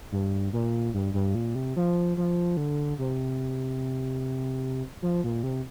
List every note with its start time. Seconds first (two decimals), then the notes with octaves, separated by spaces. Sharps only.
0.12 G2
0.53 A#2
0.94 G2
1.14 G2
1.35 A#2
1.55 C3
1.76 F3
2.17 F3
2.57 D3
2.99 C3
5.02 F3
5.24 A#2
5.43 C3